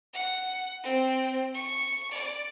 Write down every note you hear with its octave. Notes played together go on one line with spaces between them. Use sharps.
F#5
C4
C#6
D5